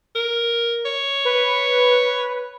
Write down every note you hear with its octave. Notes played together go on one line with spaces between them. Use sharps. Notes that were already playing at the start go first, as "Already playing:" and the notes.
A#4
C#5
B4